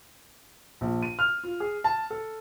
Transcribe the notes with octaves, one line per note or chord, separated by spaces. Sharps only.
A#1
D#7
F6
F4
G#4
A5
A4